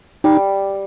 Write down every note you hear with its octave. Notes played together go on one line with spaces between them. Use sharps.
G3 D#4